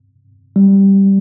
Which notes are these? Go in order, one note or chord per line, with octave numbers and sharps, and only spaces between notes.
G3